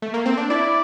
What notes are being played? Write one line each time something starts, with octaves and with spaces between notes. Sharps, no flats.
A3
A#3
C4
D4
E4 D5